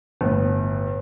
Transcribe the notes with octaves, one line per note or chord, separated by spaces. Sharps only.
G1 A2